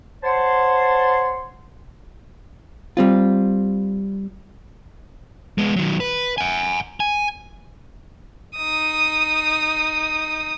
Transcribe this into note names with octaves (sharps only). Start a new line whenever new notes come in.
C5 C#5 F#5 A5 C6
G3 C4 F4
G#3 B3
D#3 F#3
B4
F#5 G#5
G#5
D#4 D#6